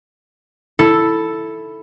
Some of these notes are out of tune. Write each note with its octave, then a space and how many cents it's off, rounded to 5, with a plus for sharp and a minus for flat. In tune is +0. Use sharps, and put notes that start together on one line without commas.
E4 +0 A4 +0